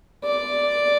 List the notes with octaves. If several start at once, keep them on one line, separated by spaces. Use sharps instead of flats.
D5